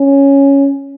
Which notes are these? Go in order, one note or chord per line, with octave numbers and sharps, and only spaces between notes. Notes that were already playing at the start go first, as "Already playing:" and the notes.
Already playing: C#4